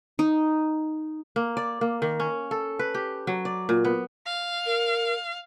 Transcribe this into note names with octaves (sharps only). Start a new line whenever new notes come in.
D#4
A#3
D5
A#3
D#3
C#4
A4
B4
G4
F#3
D5
A#2
B3
F5
A#4